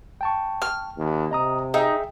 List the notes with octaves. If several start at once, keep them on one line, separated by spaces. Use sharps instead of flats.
G5 A5 C#6
F6
D#2
C3 D#5 A#5 D#6
D#4 G#4 E5 G5